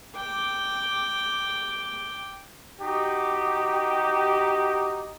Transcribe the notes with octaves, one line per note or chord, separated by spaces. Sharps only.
G5 D6
D#4 F#4 G4